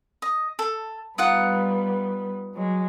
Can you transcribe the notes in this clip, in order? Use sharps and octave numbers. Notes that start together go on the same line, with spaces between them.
D#5
A4
G3 B3 D#4 F4 F#5
F#3 G#3